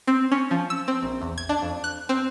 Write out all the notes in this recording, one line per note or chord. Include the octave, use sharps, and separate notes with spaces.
C4
C#4
F3
E6
C4
A#1
E2
G#6
D4
F2
F#6
C4